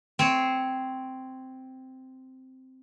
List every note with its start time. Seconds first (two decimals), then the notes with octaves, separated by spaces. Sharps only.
0.19 C4 C#5